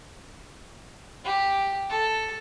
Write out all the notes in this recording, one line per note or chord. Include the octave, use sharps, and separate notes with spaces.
G4
A4